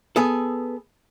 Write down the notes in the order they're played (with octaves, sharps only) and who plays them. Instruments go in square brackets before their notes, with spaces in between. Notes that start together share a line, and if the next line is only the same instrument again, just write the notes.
[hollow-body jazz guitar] B3 G#4 A4